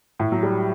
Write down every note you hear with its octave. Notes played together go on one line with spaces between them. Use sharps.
A2
F#3
G3